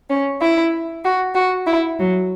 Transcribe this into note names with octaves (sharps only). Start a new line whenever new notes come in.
C#4
E4
F#4
F#4
E4
F#3